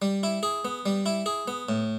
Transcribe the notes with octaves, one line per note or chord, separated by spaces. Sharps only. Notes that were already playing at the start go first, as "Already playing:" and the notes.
G3
E4
G#4
B3
G3
E4
G#4
B3
A2